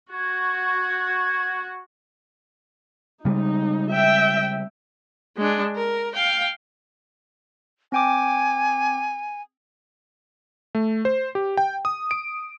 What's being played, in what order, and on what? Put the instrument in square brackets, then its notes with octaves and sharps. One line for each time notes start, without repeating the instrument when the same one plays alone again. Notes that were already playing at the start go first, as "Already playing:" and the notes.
[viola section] F#4 [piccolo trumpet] G#6
[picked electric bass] C#3 G3 G#3 [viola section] D#4
[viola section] E5 G5
[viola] G#3 D4
A#4
F5 G5
[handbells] C4 G5 D6 [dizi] G#5
[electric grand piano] A3
C5
G4
G5
D#6
D7